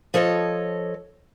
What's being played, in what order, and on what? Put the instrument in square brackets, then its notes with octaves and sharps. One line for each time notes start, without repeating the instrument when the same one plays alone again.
[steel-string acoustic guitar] F3 A4 C#5 D#5